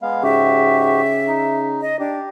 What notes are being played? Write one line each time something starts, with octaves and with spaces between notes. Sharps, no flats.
G#3 B3 F5
G#2 C#3 F#4 G4 E5
D#4
D#5
D4 G4